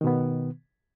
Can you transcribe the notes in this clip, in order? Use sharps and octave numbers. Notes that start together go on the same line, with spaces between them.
B2 D#3 B3